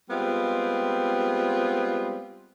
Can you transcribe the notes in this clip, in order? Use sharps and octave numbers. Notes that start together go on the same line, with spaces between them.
G3 G#3 B3 C4 F4